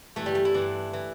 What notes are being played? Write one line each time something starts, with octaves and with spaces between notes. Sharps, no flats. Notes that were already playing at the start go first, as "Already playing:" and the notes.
G2 E3 A3
G3
A3
E4
G2 E3 D4
E3